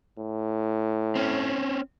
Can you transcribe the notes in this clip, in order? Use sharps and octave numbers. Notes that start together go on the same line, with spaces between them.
A2
C4 C#4